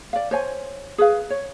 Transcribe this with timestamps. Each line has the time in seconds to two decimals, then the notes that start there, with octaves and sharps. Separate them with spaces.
0.13 D5 F5
0.31 C5 C#5 G#5
0.98 G#4 B4 F5
1.30 C#5